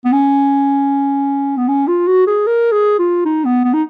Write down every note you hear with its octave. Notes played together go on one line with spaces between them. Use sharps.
B3
C#4
B3
C#4
F4
F#4
G#4
A#4
G#4
F4
D#4
B3
B3
D#4